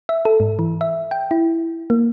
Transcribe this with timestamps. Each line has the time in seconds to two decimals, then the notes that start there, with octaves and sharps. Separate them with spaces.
0.09 E5
0.25 A4
0.40 G#2
0.59 E3
0.81 E5
1.11 G5
1.31 E4
1.90 A#3